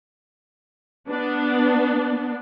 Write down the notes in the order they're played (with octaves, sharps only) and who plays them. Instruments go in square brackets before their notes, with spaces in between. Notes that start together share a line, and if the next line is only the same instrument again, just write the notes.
[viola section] B3 D4